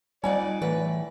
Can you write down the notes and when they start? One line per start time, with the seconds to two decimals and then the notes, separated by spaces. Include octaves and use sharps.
0.24 F2 G3 D#4 D5 F#5 G#5
0.62 A2 E3 B4